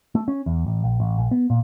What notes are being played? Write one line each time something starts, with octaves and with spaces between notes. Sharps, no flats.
A3
C#4
E2
A1
A#1
A1
A#1
B3
A#2